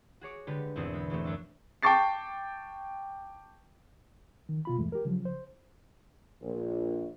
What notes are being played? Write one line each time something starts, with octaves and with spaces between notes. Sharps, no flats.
F#4 G#4 C#5 D6
D3 G#3 G4 A4 B4
G#1 E2 B2 C4 G#4
G#3 B5
A2 E3 G#3 A3 C4
F#2 D4 E6
G5 A5 C#6 D6 A6 C7
D#3
B2 F4 B5
E2 G2 E3 G#3 A3
G4 A#4
C#3 F3 F#3
C5
A#1